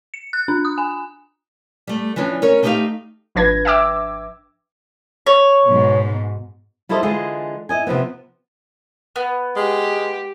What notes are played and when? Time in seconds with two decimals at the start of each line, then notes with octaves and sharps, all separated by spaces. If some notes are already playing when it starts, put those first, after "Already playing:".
0.14 C#7
0.33 F#6
0.48 D4
0.65 D#6
0.78 G#5
1.87 G3 A3
2.16 E3 F3 C#4 D4
2.42 C#4 A#4 C#5
2.63 A3 D#4 G4 C5 E5 F5
3.35 G#1 F3 D4 B4 G#6 A#6
3.65 E5 G5 D6 E6
5.26 C#5
5.68 G#2 B2
6.89 G3 E4 F4 A4 C5 D#5
7.03 D3 E3 G#3 F4 G#4 D#5
7.69 E4 D#5 G#5
7.87 C3 E3 F3 B3
9.16 B3
9.56 G#3 G4